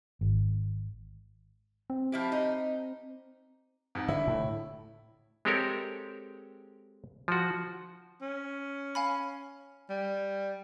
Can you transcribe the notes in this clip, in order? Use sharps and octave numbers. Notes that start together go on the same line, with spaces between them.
G#1
C4
F3 E4 G4
D#4
F2 G#2
D3 E4
A2
G#3 C4 G4 A4 A#4 C#5
F3 F#4
C#4
F5 G#5 B5
G3